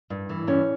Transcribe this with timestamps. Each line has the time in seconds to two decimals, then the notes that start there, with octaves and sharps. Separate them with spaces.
0.10 G2
0.29 E3
0.47 G2 C#4